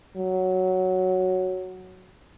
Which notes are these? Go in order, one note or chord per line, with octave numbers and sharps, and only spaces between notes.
F#3